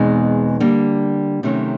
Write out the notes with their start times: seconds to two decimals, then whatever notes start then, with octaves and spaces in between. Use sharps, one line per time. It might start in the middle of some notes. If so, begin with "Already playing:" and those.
Already playing: E2 B2 G#3 C4 D#4
0.60 D3 G3 A#3
1.43 C3 D#3 F#3 A3 C#4